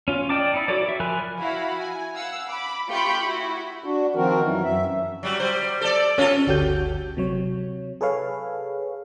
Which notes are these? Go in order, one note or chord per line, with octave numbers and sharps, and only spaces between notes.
C#4 F4
D5 D#5 G5 A5 D6
D#4 E4
F#4 A4 C#5 D5
E5
F3 A#4 G#5 B5 F#6
E4 F#4 F5 B5
G#5
F5 F#5 E6
B5 D6
A3 F4 G4 B5 C#6 G6
E4 F#4
D4 F#4
D#3 F3 C4 F#4 A#4
F#2 E3
F#2 E5
F#3 G3
G3 C5
A4 D5
C#4 F4 A4
G1 D2 F#4 G4 A4 G6
C3 F#3 C#5
G#4 A4 B4 C#5 F5